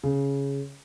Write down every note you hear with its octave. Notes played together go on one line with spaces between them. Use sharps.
C#3